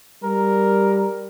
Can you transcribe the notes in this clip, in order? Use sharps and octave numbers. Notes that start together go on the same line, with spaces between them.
G3 A#4